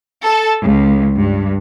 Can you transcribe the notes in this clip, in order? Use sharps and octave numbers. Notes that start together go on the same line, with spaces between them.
A4
C#2
G2